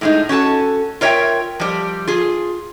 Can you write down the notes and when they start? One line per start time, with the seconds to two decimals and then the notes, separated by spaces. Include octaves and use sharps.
0.01 A2 G#3 D#4
0.29 C#4 F#4 A4 A5
1.01 F4 A#4 C#5 D#5 E5 G5
1.60 F3 G3
2.07 F4 G#4